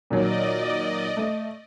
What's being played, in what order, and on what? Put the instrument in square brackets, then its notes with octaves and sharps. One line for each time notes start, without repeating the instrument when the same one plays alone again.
[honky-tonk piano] A#2 D#3 F#3 [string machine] D5 D#5
[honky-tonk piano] A3 D#5